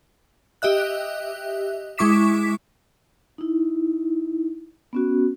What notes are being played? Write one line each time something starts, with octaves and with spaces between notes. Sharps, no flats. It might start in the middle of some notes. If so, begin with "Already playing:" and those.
G4 D#5 E5 F#6
G#3 E4 C#6 D6 B6 E7
D#4 E4
B3 C#4 F#4